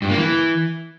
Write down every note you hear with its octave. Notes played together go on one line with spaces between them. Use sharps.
G2
A#3
E3